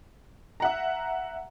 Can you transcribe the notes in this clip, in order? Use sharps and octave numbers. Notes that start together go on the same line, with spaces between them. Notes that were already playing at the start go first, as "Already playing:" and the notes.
E5 F#5 A#5